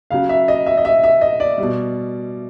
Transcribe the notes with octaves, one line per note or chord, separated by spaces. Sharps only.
C#3 F#3 F5
E5
D#5
E5
D#5
E5
E5
D#5
D5
B2 G3